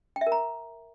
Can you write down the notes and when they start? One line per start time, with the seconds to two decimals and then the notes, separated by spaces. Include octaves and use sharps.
0.16 G5
0.21 E5
0.27 A#4
0.32 A#5